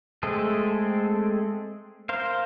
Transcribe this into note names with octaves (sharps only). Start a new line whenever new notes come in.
G#3 A3 C4 G#4 A4
A#4 C5 F5